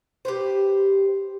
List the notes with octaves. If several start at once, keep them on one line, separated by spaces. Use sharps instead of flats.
G4 B4 C5